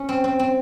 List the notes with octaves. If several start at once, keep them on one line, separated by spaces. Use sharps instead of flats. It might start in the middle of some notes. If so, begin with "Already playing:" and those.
Already playing: C#4
C4
C4
C4